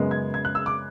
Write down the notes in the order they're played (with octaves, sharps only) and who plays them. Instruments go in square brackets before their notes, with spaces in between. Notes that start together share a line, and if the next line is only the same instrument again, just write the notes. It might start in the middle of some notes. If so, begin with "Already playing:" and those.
Already playing: [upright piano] F#2 C#3 G#3 B3
G#6
G#6
F#6
E6
D6